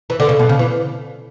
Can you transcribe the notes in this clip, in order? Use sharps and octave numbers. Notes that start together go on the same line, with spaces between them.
E3
D3
C#3
B2
C#3
E3